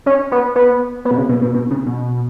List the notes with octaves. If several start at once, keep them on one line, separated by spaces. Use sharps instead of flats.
C#4
B3
B3
B3
B2
C#3
B2
B2
B2
C#3
B2